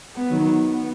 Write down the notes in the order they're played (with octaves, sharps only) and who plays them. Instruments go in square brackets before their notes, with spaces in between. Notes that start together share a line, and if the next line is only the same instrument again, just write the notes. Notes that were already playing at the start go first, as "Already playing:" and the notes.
[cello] B3
[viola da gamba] D#3 F#3
[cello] B3